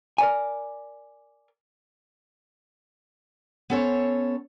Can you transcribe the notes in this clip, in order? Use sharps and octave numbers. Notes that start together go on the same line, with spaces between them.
A#4 D5 G#5
B3 C#4 A4 C5 C#5